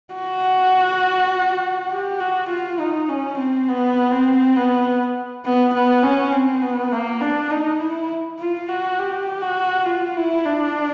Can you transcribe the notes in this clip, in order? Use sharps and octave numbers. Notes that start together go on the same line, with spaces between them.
F#4
G4
F#4
F4
D#4
C#4
C4
B3
C4
B3
B3
B3
C#4
C4
B3
A#3
D4
D#4
E4
F4
F#4
G4
F#4
F4
E4
D4